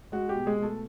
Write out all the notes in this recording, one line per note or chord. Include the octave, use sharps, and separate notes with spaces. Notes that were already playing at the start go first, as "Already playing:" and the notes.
G#3 F#4
G4
B2
G#3 G#4
B2 A3 A4